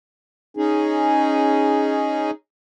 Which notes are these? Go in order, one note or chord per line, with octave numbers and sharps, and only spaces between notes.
C#4 D#4 G#4